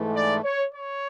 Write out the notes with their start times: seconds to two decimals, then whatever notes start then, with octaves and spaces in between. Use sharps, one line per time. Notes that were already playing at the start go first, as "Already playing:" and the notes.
Already playing: G#2 E3 A3
0.15 D5
0.43 C#5
0.72 C#5